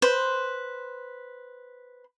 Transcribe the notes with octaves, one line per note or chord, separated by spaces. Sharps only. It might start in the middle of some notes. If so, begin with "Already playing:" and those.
B4 C5